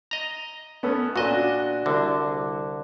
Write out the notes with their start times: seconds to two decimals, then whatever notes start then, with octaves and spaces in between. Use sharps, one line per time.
0.11 D#5 A#5
0.83 B3 C#4 A4
1.16 A#2 D4 F#4 D#5
1.86 C2 D3